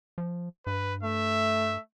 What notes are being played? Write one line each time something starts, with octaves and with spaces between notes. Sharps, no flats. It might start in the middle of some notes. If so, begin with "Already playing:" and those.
F3
G2 B4
A3 E5